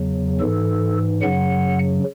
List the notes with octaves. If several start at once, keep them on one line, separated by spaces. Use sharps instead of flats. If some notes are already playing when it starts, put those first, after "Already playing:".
Already playing: E2 C#3 F#3
G#2 E3 A4
F#2 C#3 F#3 F#5